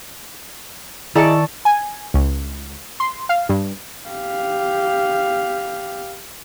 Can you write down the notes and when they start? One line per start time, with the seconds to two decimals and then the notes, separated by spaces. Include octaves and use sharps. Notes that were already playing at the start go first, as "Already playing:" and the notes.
1.15 D#3 E4 G#4 D5 D#5 A5 A#5 C#6
1.65 G#5
2.14 C#2
3.00 C6
3.29 F5
3.49 G2
4.09 G4 F5